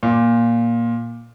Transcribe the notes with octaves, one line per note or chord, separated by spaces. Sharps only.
A#2